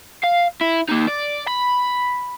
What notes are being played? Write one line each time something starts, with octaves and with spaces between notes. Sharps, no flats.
F5
E4
A#3 D#4
D5
B5